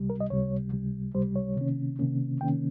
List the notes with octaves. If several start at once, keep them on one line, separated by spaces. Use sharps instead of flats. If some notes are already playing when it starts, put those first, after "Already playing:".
Already playing: C#2 C3 G3
A#4
D#5
C#2 C3 G3 C#5
C#2 C3 G3
C#2 C3 G3 C5
C#5
C3 D#3 A#3 C#4
C3 D#3 A#3 C#4
C3 D#3 A#3 C#4 G5